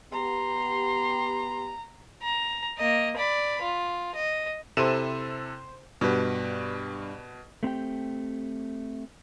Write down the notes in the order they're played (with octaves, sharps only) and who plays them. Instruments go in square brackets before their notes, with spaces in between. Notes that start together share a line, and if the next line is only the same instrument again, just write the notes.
[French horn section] B3 G4 [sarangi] A#5 [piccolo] C6
[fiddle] A#5
A#3 D#5
D5 B5
F4
D#5
[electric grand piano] C3 E4 A4 [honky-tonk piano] C5 D#7 E7
[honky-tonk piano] G2 [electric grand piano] B2 B4
[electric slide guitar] A3 C4 G4 G5